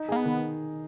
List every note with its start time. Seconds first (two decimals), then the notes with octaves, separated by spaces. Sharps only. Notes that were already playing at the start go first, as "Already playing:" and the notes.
Already playing: D#4
0.09 A#3 G#4
0.16 B3
0.26 D#3